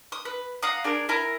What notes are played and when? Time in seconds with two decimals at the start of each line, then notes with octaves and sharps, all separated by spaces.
0.12 D#6
0.25 B4
0.63 F5 F#5 A#5 D#6
0.84 D4 G#4 A#4
1.09 E4 A#4 G#5 A#5